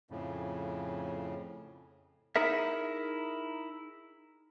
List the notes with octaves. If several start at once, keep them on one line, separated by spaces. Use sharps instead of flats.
F2 A2 C#3
D#4 E4 G#4 A#4 E5